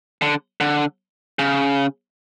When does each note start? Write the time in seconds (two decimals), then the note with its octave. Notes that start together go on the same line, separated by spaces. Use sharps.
0.22 D3
0.61 D3
1.39 C#3